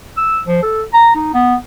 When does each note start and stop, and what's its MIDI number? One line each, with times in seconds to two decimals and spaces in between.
0.17 0.40 88
0.47 0.63 53
0.63 0.83 69
0.94 1.13 82
1.15 1.34 63
1.34 1.55 59